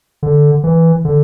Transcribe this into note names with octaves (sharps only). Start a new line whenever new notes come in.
D3
E3
D3